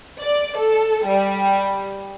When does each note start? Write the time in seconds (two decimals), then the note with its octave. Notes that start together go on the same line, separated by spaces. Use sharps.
0.20 D5
0.57 A4
1.06 G3